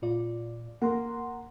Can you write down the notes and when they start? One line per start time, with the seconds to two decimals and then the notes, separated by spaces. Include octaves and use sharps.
0.02 A#2 F4 D5
0.82 A#3 F#5 A#5 C6